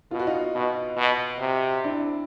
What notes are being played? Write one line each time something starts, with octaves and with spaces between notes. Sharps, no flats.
B2 F4
F#4
D#4 F4
B2
B2
C3
D4 E4